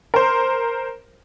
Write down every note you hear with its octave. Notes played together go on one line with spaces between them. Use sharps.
A#4 C5